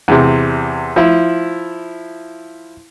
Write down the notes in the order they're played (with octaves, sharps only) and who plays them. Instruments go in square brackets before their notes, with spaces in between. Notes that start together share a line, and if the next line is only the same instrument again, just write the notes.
[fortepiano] E2 C3
F3 E4